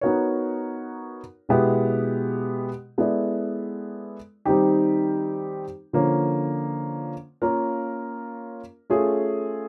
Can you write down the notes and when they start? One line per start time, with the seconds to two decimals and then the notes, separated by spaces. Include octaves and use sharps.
0.01 B3 D#4 F#4 A#4 C#5
1.49 B2 G#3 B3 E4 G4
2.98 G#3 B3 E4 A4 D5
4.45 D#3 G3 C4 D#4 G4
5.93 D3 F3 A#3 C#4
7.42 A#3 C#4 F4 A#4
8.90 A3 C#4 F4 G#4